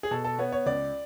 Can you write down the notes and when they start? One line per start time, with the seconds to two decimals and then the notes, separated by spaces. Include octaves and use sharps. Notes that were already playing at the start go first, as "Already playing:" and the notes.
0.03 G#4
0.11 B2 A4
0.24 A4
0.39 B3 C#5
0.52 C#5
0.66 C#2 D5